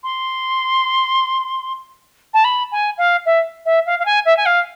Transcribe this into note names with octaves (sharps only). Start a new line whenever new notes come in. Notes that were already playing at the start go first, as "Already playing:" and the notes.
C6
A5
B5
G#5
F5
E5
E5
F5
F5
G#5
E5
G#5
F5